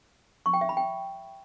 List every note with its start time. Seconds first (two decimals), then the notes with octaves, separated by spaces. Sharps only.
0.46 C#6
0.54 G5
0.61 E5
0.69 B5
0.77 G5